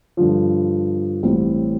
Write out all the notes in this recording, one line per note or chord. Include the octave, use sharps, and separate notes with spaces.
G2 D3 F3
A1 A2 G3 C4